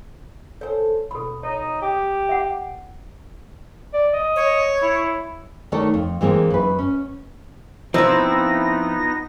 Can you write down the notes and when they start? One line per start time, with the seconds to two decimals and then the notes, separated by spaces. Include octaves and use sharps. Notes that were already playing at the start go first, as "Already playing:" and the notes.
0.61 A4 C5 C#5 G#5
1.11 B2 A4 B5
1.43 D#4 C#5
1.82 G4
2.29 E5 F#5
3.93 D5
4.14 D#5
4.36 C#5
4.82 E4
5.72 D#3 A3 D4 A4 C#5
5.94 F2
6.21 E3 G#3 A#3 C4
6.51 F#2 B4
6.79 C#4
7.94 F3 B3 C4 D#4 E4 A#6